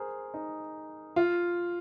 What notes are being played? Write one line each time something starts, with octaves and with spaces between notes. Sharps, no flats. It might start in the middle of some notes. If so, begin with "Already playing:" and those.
Already playing: G#4 A#4 C5
D#4
F4